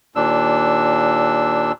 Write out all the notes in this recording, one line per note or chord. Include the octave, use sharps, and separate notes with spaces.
D#2 A#2 D4 E6